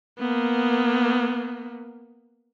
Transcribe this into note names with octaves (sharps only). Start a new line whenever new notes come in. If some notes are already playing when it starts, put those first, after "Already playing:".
A#3 B3